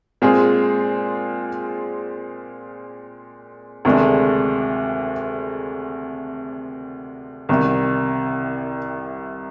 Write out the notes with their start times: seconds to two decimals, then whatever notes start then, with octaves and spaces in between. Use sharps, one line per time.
0.22 A#2 G#3 C4 F4 G#4
3.85 D2 C3 D#3 G#3 D4
7.49 C2 C3 D#3